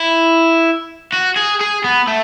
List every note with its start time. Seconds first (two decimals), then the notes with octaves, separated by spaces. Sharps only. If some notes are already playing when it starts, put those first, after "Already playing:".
Already playing: E4
1.12 F#4
1.36 G#4
1.60 G#4
1.84 B3
2.07 A3